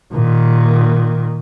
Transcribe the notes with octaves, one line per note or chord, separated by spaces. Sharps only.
A#2 D#3